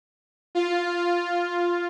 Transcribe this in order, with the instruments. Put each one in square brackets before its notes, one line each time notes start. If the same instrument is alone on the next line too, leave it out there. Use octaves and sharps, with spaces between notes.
[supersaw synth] F4